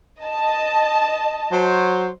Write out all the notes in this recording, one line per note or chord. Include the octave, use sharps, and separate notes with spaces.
D#5 A5
F#3 C5